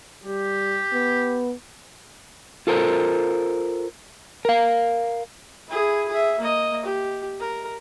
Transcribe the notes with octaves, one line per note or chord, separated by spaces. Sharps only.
G3 G4
B3
F4 A4 A#4 C5
A#4 F5
E4 G#4
G#4 E5
A#3 D#5
G4
A#4